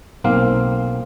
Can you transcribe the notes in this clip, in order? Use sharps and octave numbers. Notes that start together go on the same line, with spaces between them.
B1 A#3 C4 F5